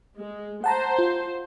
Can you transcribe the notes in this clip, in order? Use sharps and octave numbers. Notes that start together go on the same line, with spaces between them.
G#3
C5 F#5 A5 A#5
F4